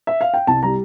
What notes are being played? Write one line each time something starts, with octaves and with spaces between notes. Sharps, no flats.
E5
F5
G5
C2 A5
G3 A#5